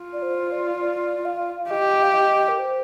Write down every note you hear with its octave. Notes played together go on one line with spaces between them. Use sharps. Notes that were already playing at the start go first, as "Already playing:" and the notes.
Already playing: F4
D5
C5
D5
D5
F5
G4 D#5
F5
D#5
A#4
C5